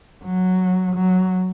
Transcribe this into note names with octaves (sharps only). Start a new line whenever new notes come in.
F#3
F#3